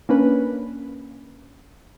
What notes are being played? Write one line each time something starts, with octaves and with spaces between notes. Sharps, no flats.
A#3 C#4 D4 B4